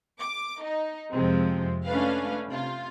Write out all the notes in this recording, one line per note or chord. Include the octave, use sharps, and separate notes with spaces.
D6
D#4
F2 C3 F3 G#3 C4
A3 C#4 D4 B4 F5
C3 F4